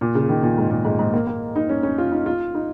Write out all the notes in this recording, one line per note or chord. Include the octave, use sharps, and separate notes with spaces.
A#2
C#3
D#3
A#2
G#2
A#2
G#2
G#2
A#3
A#3
D#4
C#4
C#4
F4
D#4
F4
D#4